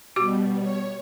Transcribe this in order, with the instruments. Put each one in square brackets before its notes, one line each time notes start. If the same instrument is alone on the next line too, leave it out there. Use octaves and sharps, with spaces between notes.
[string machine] B2 G3 [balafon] F#4 G4 D6
[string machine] C#5